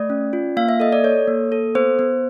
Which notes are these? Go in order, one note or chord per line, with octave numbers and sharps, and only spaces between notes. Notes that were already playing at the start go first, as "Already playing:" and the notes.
Already playing: A3 D5
C#4
F4
A#3 F5
E5
A4 D#5
D5
A4 C#5
A#3
A4
B3 C5
B3